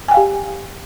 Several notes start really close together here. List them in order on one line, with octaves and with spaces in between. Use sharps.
G#5 G5 F5 G4